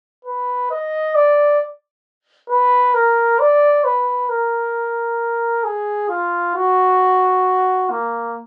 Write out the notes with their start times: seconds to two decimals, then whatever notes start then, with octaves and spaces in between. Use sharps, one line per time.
0.24 B4
0.70 D#5
1.15 D5
2.49 B4
2.94 A#4
3.39 D5
3.84 B4
4.29 A#4
5.64 G#4
6.09 F4
6.55 F#4
7.90 A#3